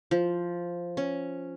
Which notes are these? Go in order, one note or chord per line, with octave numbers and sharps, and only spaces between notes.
F3
C#4